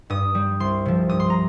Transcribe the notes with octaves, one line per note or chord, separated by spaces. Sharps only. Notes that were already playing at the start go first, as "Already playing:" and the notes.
G2 D#6
G3
C2 C6
C3 F3
G2 D#6
C6
A#5